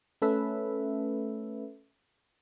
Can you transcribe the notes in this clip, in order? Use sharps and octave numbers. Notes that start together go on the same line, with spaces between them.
A3 C#4 A4 B4 E5